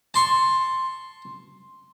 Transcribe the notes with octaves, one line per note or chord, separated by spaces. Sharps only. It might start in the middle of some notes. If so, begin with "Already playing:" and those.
A5 C6 C#6